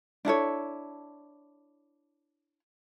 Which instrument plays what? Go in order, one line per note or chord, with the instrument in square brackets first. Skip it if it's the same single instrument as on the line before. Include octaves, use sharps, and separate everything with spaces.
[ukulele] D4 E4 A4 C#5